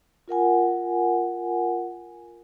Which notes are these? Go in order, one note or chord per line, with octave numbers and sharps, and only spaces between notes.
F4 A#4 F#5 G#5